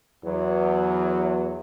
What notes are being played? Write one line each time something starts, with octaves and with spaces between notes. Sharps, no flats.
E2 F#3